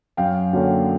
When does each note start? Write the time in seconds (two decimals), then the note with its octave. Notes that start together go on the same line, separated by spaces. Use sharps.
0.17 F#2 F5 G5
0.53 D3 F#3 A#3 C#4